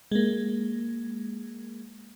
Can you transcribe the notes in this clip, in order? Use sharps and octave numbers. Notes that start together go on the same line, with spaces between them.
G#3 A#3